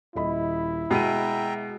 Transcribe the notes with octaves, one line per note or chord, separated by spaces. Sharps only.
D#1 E4 D#5 B5
B2 G#3 E5 G5 A#5 D#7